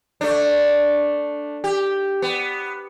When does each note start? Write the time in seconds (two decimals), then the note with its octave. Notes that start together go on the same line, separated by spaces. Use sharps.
0.21 A3 D4
1.64 G4
2.22 B3